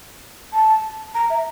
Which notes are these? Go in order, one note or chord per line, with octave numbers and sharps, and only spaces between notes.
A5
A#5
E5